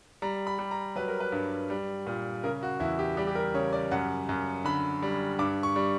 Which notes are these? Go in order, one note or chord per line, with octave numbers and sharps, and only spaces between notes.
G3 A#5
B5
G3
A#5
F#3 B4
A#4
B4
G2
G3
A#2
C#3 A#4
F#4
E2 E4
G4
G3 G4
G4
A#4
C#3 C#5
D5
F#2 F#5
F#2
D3 B5
G3
G2 D6
C#6
G3